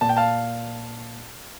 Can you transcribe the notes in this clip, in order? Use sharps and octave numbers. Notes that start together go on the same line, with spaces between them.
A#2 A5
G5
F5 A5